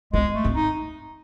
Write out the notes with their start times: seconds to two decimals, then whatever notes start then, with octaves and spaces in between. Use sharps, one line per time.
0.13 G#3 B3
0.34 A3
0.44 C4
0.54 D#4